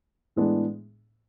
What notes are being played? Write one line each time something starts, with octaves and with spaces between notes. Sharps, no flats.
A2 E3 G#3 B3 D4